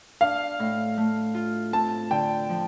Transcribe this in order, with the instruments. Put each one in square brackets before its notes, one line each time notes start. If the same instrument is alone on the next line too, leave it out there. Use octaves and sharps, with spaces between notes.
[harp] D4 [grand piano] F5
[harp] A2
A3
F4
[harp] C4 [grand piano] A5
[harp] D3 [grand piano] G5
[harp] F3